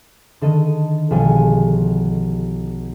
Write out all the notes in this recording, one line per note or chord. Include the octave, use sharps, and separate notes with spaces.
D3 D#3 A4 D#5
B1 F3 G3 G#3 A4 G#5